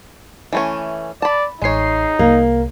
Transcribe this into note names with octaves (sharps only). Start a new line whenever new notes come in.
E3 A3 C#4
D5 A5 B5
A1 G#3 D#4 C#5 C7
C2 A#3